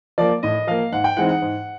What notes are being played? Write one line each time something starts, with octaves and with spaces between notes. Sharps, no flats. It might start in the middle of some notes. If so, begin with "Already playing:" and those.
F3 A#3 D5
A2 D#5
F3 A#3 F5
G#2 F#5
G5
E3 G#3 C4 D#4 F#5
F#5
G#2